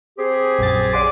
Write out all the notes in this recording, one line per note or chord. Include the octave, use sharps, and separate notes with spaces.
C4 G4 G#4
A#1 F#2 A6
C#3 D5 F#5 G#5 C6 D6